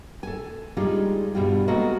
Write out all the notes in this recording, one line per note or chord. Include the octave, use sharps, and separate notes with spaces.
A4 G#5
G3 G#3 D4 D#4 F4 G#4
G2 B2 G3 F4
G#3 A#3 B3 F#4 A4